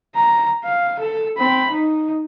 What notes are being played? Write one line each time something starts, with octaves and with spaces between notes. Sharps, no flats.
A#5
F5
A4
C4 B5
D#4